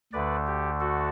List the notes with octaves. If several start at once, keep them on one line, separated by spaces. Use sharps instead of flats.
D2 D3 A3 B4 D5
G4
F#4 A4